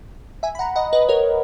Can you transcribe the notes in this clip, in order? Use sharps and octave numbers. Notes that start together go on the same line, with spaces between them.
E5 G#5
B5
F#5 A#5
D#5 F#5
B4 D#5
A#4 C#5